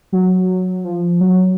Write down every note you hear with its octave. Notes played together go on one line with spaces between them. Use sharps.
F#3
F3
F#3